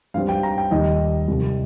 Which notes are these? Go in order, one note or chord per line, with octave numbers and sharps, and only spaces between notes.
G2 G3 C4 F5
G5
A#5
G5
D#2 D#3 G3 D#5
C2 C3 G3